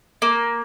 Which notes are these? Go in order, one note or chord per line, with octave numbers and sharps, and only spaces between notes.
A#3